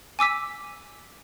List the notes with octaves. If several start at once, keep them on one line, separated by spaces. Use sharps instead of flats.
G#5 D6 E6 B6